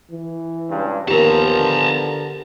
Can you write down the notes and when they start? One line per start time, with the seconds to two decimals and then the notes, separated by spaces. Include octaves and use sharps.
0.11 E3
0.70 C#2 G2
1.08 D#2 F3 B3 G4 A#4 A5 A#5
1.55 D3